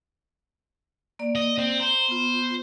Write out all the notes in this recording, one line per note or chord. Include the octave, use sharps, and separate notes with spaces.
A#3 D5
D#5
C4
C5 A#5 C6
B3 F4